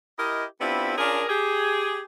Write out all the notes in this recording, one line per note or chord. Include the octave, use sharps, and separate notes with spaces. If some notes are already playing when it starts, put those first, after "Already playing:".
E4 G4 A#4 D#5
B3 C4 D4 E4 F4 G4
C#4 D4 F4 G#4 A#4
G4 G#4